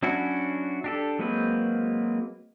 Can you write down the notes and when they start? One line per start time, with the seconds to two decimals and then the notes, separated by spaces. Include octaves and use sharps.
0.03 F#3 C#4 D4 E4 F#4
0.84 D4 G4 A4
1.19 F#3 G#3 A#3 C4 B4